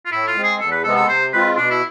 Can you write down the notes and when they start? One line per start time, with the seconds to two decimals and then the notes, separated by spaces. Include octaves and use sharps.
0.06 F4
0.11 A2 E4
0.28 F4
0.36 G#3 C4
0.44 G#4
0.60 E2 A4
0.71 B4
0.84 C3 G#3 B3 A4
0.96 A4
1.08 C3 C5
1.33 G#3 C4 F4 B4
1.57 B2 D4
1.70 E4